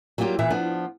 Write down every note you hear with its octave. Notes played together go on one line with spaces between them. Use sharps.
F#3 G3 A#3 F4 G4
A#2 E3 E4 E5
F3 B3 D4